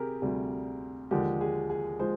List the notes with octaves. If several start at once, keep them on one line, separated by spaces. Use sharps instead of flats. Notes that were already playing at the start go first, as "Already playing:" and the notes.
Already playing: C3 G4 G#4 A#4
D2 C3 G3 G#4
D#2 D3 F3 G#3 G4
G#4
G#4
F3 G#3 C5